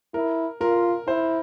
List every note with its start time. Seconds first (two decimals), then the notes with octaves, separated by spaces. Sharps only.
0.14 E4 A#4
0.61 F4 A#4
1.07 E4 C5